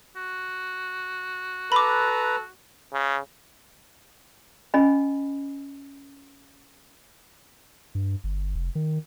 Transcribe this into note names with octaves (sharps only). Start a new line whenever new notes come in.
F#4
A4 B4 A#5 B5 D6
C#3
C#4 D#5 G#5 B5
G2
G1
F1
D#3